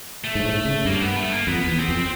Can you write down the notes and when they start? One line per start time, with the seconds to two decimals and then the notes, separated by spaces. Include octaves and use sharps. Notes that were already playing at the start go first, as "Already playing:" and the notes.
0.24 A3
0.35 G#2
0.45 A2
0.65 C#3
0.85 G2 A#3
1.01 B3
1.16 A3
1.32 A#3
1.47 F2 B3
1.67 E2
1.78 C4
1.89 F2